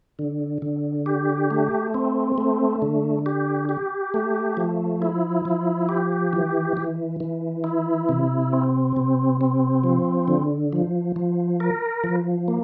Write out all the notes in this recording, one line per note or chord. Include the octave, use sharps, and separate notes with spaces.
D3
D3
G4
A3
C4
A3
D3
G4
G4
A3
F3
E4
F3
G4
E3
E3
E3
E4
C3
C4
C3
C4
F3
D3
F3
F3
A#4
F3
A#3